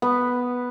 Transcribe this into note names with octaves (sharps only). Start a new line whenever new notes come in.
B3